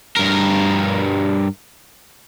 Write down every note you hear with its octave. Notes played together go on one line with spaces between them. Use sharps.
G2 A#4